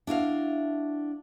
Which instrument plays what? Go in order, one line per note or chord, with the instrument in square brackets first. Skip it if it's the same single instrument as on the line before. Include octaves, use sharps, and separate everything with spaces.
[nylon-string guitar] D4 E4 F#4 F5